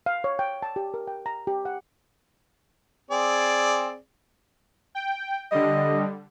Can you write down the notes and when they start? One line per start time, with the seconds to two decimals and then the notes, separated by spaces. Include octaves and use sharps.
0.06 F5
0.24 C#5
0.39 G5
0.63 A5
0.76 G4
0.94 A#4
1.08 G5
1.26 A#5
1.47 G4
1.65 F#5
3.11 C4 G#4 D5
4.95 G5
5.52 D3 G3 D#5